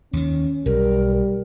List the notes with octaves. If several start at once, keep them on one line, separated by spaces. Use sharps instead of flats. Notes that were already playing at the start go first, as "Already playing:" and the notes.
D#2 D#3 C#4
B1 G3 A#4